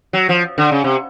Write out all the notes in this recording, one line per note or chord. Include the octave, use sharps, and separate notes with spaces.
F#3
F3
D3
C#3
C3